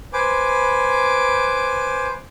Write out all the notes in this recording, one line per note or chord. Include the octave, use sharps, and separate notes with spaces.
B4 C5 G#5 D6